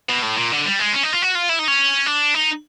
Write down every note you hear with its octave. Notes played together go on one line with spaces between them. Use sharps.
B2
A2
A#2
D3
G3
G#3
C#4
D#4
F4
F#4
F4
E4
D#4
C#4
D4
D#4